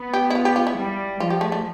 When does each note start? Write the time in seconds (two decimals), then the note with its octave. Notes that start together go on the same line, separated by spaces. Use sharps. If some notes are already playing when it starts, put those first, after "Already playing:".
Already playing: B3
0.13 G4
0.30 E4
0.35 F4
0.45 G4
0.56 F4
0.67 E4
0.77 G3
1.20 F3 F4
1.30 G4
1.41 A3
1.52 A3